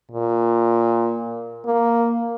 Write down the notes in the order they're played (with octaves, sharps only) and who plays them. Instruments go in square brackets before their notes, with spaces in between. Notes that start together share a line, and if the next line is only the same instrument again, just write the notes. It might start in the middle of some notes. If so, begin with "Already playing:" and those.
[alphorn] A#2
A#3